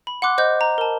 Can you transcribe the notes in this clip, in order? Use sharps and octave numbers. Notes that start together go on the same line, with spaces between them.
B5
F#5 C6 D6 F#6
C5 D#5 G6
A#5
A#4 A5